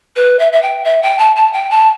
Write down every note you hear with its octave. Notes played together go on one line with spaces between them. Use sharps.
B4
E5
E5
G5
E5
G5
A5
A5
G5
A5